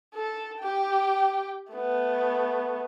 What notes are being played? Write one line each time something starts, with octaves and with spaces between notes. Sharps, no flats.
A4
G4 G5
A3 B3